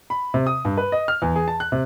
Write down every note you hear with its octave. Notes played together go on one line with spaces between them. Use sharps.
B5
C3
D#6
G2
B4
D#5
F6
E2
G#4
A5
F#6
C3